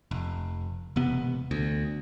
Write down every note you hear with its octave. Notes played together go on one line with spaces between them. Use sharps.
F1
E1 C3 B3
D2